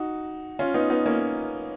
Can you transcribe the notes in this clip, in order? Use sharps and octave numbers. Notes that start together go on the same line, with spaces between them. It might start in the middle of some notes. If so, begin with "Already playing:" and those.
Already playing: D#4 F#4
C#4 F4
B3 D#4
B3 D#4
A#3 C#4